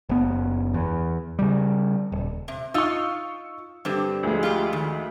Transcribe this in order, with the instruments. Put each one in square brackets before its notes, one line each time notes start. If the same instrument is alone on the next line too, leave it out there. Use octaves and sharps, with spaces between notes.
[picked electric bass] F#1 B3
E2
C#3 G3
D#1
[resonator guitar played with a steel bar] C3
[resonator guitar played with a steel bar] D#4 F4 [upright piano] C#6 E6
[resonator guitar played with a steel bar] G2 D3 C4 [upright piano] G3
[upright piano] D2 F3 G#3
[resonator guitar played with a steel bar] F4 G4
D#3